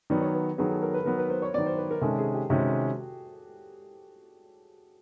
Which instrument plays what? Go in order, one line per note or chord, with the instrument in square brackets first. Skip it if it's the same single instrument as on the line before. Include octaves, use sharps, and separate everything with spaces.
[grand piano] D#3 F#3 B3 [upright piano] D5
[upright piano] C#5
B4
[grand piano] D#3 F#3 B3 [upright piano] G#4
[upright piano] A4
A#4
B4
[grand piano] D#3 F#3 B3 [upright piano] A#4
[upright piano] B4
C5
C#5
[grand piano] D#3 F#3 B3 [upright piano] D5
[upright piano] C5
B4
A#4
[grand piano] C3 D#3 G#3 C#4 [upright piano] A4
[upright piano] G#4
G4
[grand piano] C3 D#3 G#3 C#4 [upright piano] F#4